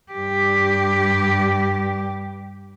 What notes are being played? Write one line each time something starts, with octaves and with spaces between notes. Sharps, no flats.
G2 G4